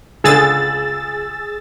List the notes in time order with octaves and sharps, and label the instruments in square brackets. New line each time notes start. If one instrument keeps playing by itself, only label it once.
[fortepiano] C#2 D3 [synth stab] G#4 E6 A6